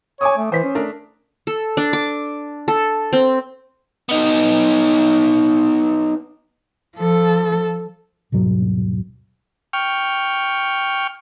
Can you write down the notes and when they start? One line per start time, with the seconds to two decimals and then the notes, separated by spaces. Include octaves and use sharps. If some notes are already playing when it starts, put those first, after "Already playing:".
0.21 C#5 G#5 D6 D#6
0.38 A3
0.52 E3 C5 B6
0.64 C#4
0.75 A3 D4 A#4
1.47 A4
1.77 D4
1.93 D6
2.68 A4
3.13 C4
4.09 B3 D#4
6.97 F3 A4
8.32 D#1 G#2 B2 F#3
9.73 G5 C#6 F6